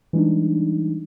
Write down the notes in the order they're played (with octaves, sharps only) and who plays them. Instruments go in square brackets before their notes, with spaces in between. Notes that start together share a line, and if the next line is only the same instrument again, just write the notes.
[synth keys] E3 G3 G#3 D4 D#4